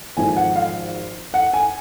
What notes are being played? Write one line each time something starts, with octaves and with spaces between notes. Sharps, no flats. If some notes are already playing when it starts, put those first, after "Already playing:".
G#1 G#2 F3 G#5
F#5
F5
F#5
G#5